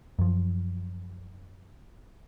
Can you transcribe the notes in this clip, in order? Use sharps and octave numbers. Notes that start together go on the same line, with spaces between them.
F#2 F3